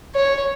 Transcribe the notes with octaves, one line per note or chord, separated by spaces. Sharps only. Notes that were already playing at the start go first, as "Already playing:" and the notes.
C#5